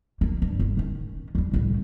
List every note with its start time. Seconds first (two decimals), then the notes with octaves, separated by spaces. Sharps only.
0.21 A#3
0.42 G2
0.59 G#1 E2
0.77 D#3 C#4
1.35 D#2 G3
1.54 C2 A2